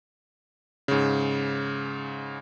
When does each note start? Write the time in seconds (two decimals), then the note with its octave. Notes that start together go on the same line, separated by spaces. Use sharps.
0.88 G#2 C#3